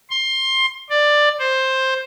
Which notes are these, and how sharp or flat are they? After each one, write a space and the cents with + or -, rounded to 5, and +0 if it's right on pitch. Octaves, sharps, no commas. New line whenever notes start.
C6 +20
D5 +10
C5 +10